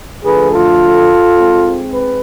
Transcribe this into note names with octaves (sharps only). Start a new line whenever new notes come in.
D2 D3 F3 A3 G#4 B4
F4 A4
G#2 G#3 C4
B4